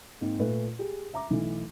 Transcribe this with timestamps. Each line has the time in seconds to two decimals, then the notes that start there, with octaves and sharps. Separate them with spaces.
0.21 G#2 A#3 C4
0.40 A#2 A3 B4
0.79 G4 G#4
1.13 E5 A#5 D6
1.30 B1 E3 A3